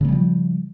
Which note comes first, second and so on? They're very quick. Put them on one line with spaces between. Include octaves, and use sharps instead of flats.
C#3 A#3 G3 F3